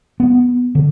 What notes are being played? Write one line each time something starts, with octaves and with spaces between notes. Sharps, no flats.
B3
D3